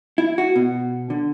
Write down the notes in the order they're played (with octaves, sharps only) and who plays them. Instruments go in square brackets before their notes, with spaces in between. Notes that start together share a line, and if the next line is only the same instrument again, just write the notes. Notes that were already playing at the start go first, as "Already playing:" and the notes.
[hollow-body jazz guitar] E4
F#4
B2
D3